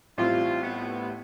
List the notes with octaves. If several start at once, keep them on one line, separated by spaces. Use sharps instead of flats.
A1 A2 G3 C4 E4 F4
B3